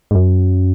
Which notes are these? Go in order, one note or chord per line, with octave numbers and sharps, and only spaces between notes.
G#2
F#2